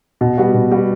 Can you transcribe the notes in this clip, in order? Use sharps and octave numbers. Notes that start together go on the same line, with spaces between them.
B2
G3 B3 F#4
B2
G3 B3 F#4